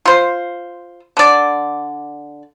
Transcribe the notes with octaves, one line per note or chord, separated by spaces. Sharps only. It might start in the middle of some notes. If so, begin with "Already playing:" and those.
F4 C5
D3 D5